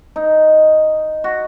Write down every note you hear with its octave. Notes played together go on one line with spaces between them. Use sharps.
D#4
F#4